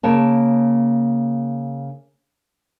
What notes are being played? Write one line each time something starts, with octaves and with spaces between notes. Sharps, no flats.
C#3 A#3 C#5 A5